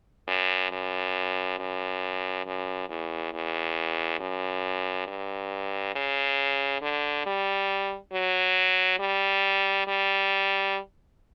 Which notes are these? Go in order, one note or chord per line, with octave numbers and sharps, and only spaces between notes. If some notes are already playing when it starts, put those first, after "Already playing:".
F#2
F#2
F#2
F#2
E2
E2
F#2
G2
C#3
D3
G3
F#3
G3
G3